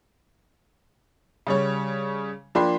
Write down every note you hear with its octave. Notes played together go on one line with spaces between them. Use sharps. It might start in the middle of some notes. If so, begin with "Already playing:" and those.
C#3 G3 C#5
F3 A#3 D4 G5 B5 C6